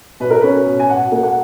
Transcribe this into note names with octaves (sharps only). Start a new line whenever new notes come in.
B2 B4
A#4
C#4 B4
B2
G#5
B2 F#5
A#3
F#5